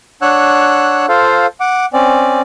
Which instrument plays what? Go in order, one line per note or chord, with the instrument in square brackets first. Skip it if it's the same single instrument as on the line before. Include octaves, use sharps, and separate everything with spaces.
[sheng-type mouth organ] D4 C#5 F#5 E6 F#6
F4 A4 C5 F5
F#5 D6
C4 C#4 D5